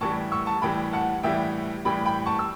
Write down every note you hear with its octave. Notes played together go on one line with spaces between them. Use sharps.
A2 E3 G3 A5 C#6
C#6 E6
A5 C#6
A2 E3 G3 G5 B5
F#5 A5
A2 E3 G3 E5 G5
A2 E3 G3 G5 B5
G5 B5
A5 C#6
E6